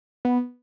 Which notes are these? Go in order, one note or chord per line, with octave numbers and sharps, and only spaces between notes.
B3